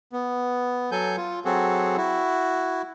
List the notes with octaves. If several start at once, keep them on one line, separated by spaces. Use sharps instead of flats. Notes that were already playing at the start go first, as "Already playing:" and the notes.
B3
F#3 A4 G#5 G6
F4
F#3 C4 F#4 G#4 A4
E4 F#4